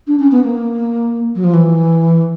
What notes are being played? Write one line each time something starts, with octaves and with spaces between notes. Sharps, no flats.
D4
C#4
B3
A#3
F#3
F3
E3